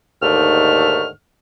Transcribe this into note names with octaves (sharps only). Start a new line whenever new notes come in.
D#2 G#2 D3 D#3 A3 F6